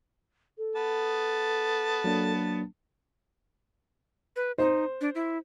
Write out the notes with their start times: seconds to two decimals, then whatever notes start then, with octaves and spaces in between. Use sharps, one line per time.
0.58 A4
0.76 B3 A5
2.04 F#3 A#3 D4
4.36 B4
4.58 D#4 C5
5.01 D4
5.15 E4